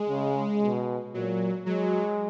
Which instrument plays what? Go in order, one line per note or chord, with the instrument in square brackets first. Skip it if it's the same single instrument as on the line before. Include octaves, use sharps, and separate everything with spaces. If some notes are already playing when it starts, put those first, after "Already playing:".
Already playing: [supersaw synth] G#3
[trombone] C#3
B2
[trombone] A#2 [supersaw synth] F#3
[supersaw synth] F#3 [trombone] G#3